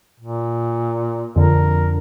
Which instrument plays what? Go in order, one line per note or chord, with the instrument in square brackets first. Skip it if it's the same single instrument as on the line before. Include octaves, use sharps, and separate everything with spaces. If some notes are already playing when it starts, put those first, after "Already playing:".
[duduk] A#2
[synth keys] F2 D3 [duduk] A#4